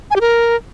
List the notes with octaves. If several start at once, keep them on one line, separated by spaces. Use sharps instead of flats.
G#5
G4
A#4